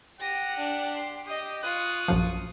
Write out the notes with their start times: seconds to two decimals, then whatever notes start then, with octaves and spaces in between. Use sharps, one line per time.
0.20 G4 F#5 A#6 D#7
0.58 D4
0.95 C6
1.27 G4 D#5 D#6
1.63 F4 C#6 D#6 F#6
2.08 A#1 F#2 F3